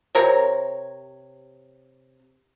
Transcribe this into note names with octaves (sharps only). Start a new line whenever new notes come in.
C3 A#4 C#5